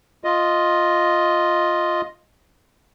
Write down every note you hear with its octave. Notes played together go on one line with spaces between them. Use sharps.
F4 D#5